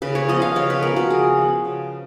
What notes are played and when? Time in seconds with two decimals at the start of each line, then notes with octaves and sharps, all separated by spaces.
0.02 C#3 B4
0.15 C#5
0.28 F3 B3 D#5
0.42 F5
0.56 C#3 C#5
0.70 B4
0.82 F3 B3 A#4
0.96 F#4
1.10 C#3 G#4
1.37 F3 B3
1.65 C#3